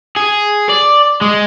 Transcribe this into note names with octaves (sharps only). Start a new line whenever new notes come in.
G#4
D5
G#3